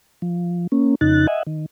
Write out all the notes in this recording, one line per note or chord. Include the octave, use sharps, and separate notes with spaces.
F3
A#3 C#4
F2 C#3 D#4 F#6 A6
D#5 E5 F#5 G#5
D#3